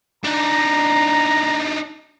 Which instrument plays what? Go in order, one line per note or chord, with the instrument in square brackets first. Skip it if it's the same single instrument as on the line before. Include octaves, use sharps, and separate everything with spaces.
[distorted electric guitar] D4 D#4 [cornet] A#5